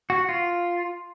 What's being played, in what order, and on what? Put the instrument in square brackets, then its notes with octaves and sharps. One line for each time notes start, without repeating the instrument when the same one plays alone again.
[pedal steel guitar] F#4
F4